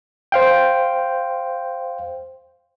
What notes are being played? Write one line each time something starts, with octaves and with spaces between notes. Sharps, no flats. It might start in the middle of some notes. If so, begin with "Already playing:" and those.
C5 F5 G5